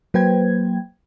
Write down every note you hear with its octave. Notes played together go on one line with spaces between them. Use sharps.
F#3 A#3 B4 C5 G5 G#6